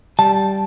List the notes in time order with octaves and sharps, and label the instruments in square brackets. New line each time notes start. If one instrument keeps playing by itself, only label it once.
[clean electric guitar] G3 A5